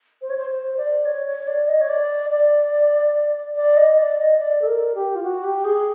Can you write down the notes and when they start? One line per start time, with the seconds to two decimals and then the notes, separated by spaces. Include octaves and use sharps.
0.22 C5
0.30 C#5
0.37 C5
0.49 C5
0.77 D5
1.05 C#5
1.27 C#5
1.47 D5
1.68 D#5
1.81 C#5
1.89 D5
2.30 D5
3.56 D5
3.77 D#5
3.98 D5
4.19 D#5
4.39 D5
4.62 A4
4.67 A#4
4.95 G4
5.15 F4
5.23 F#4
5.44 G4
5.65 G#4